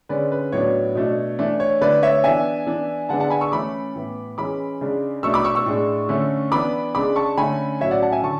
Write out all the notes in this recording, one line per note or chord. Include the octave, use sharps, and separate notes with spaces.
D3 G#3 C#4 B4 D5
B4
A2 F#3 B3 D4 C#5
B2 A3 D4
E3 A3 D4
C#5
D3 A3 D4 B4 D5
C#5 E5
E3 B3 D4 E5 G#5
E3 B3 D4
D3 G#3 B3 D4 F#5 A5
F#5 A5
G#5 B5
C#6 E6
E3 A3 C#4 B5 D6
A2 E3 B3
E3 G#3 C#4 B5 D6
C#3 G#3 D4
B2 A3 D4 C#6 E6
B5 D6
C#6 E6
C#6 E6
A2 G#3 D4
D3 A3 C#4
E3 B3 D4 B5 D6
C#3 G#3 D4 B5 D6
A5 C#6
D3 A3 C#4 G#5 B5
A2 F#3 C#4 C#5 E5
D5 F#5
F#5 A5
E5 G#5
D3 A5 C#6